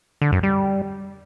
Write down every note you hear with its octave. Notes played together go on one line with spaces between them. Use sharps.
D3
F#2
G3